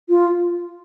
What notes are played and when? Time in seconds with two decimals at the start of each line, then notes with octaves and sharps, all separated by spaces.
0.09 F4